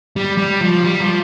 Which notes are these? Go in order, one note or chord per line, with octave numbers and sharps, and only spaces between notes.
G3
G3
F3
G3
F3